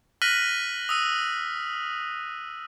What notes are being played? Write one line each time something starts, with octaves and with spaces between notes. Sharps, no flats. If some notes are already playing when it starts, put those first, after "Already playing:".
F6 F#6 A#6 B6 D#7 F#7
D#6 E6 D#7